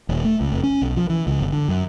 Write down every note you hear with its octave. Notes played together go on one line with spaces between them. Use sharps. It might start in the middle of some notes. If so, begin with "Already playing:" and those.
D#1
A3
C#2
F1
C#4
B1
F3
E3
C#2
G1
D3
F#2